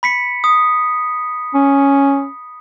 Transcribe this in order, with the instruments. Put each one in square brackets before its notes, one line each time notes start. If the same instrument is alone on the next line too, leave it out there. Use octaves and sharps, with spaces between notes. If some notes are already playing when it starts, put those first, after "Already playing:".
[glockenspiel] B5 B6 C#7
D#6
[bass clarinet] C#4